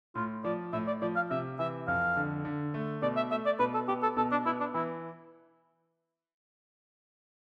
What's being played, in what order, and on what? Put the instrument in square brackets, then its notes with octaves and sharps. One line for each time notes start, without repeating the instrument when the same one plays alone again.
[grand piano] A2 [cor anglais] F4
[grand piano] F3 [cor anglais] D5
[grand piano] A2 [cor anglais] E5
[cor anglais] D5
[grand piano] F3 [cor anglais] D5
[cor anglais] F5
[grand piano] C3 [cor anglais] E5
[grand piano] E3 [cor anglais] E5
[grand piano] F2 [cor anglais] F5
[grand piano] D3
D3
A3
[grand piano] B2 [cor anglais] D5
[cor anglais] E5
[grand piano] A3 [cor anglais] E5
[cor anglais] D5
[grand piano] B2 [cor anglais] B4
[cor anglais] A4
[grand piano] B3 [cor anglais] G4
[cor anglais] A4
[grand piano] B2 [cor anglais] A4
[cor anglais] D4
[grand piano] B3 [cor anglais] E4
[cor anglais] D4
[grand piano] E3 [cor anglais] E4